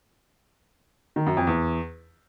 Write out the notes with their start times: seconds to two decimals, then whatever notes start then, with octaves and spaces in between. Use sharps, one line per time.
1.16 D#3
1.26 F#2
1.37 F2
1.47 E2